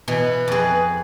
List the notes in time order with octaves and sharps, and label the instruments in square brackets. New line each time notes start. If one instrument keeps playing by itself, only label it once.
[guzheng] B2 E3 [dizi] B4
[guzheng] F2 G#4